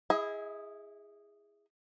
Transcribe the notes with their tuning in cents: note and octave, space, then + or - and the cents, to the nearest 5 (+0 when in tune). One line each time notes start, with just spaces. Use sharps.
E4 +0 G#4 -10 D#5 +35